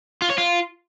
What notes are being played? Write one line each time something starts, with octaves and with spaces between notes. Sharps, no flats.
F4
C#5
F4